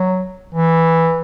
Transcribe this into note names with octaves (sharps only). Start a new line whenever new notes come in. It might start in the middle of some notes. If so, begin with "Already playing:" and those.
Already playing: F#3
E3